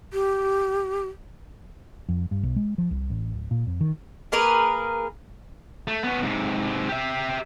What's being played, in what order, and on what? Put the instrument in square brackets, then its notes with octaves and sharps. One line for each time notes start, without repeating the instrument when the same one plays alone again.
[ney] G4
[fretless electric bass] F2
G2
B1
G#3
F3
C2
A1
D1
A#2
F2
D#3
[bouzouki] A#3 G#4 A#4 B4
[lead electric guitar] A3
B3 C#4
G#2 C3
G4 E5